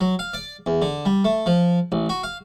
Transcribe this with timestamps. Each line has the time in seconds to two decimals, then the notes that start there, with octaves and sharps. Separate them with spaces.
0.01 F#3
0.19 F5
0.34 D5
0.66 E2
0.82 D3
1.06 G3
1.25 A3
1.46 F3
1.92 A1
2.09 F#4
2.23 F5